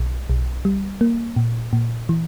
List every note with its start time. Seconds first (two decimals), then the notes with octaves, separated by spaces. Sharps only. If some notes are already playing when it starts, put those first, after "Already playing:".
Already playing: B1
0.30 B1
0.65 G3
1.01 A#3
1.36 A#2
1.73 A#2
2.09 E3